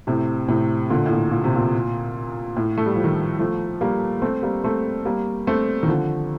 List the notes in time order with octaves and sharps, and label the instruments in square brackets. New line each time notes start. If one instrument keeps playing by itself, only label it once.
[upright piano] A2 C3
A2 C3
A#2 D3
A2
A#2
A#2
C3
A#2
A2
A3
G3
F3
D#3 G3
F3 A3
G3 A#3
A3 C4
G3 A#3
A3 C4
G3 A#3
A3 C4
D#3
D3 F3